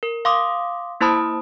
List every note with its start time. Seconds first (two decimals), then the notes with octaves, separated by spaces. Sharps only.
0.03 A#4
0.25 F5 C6 D6 D#6
1.01 A#3 E4 C5 A5 B5 D#6